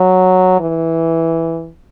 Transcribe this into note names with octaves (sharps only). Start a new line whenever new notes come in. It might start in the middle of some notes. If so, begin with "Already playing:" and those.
Already playing: F#3
E3